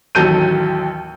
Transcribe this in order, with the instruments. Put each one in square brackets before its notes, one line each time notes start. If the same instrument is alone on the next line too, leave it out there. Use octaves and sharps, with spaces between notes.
[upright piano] A1 D#2 F#3 A4 G6 D#7